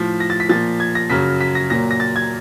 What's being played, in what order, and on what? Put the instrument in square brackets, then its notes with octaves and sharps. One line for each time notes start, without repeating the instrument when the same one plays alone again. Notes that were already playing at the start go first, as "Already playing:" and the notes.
Already playing: [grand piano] A2 F3 B6
A#6
A6
B6
A#2 F3 A6
G#6
A#6
F#2 C#3 F#3 B6
B6
A#6
A#2 F#3 A#6
A#6
A6
G#6